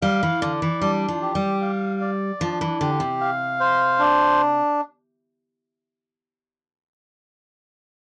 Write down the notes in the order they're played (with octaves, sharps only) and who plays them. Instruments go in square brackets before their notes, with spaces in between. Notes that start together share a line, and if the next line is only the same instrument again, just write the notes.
[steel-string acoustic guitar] G3 [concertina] F5
[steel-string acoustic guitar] E3
[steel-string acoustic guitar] D3 [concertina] D5
[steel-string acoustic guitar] E3
[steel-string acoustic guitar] G3 [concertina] D4
[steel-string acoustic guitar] F3
[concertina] G4
[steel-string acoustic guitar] G3
[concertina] F5
D5
[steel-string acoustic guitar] F3 [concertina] D4
[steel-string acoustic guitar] E3
[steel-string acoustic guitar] D3 [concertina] G4
[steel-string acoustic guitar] C3
[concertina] F5
C5
D4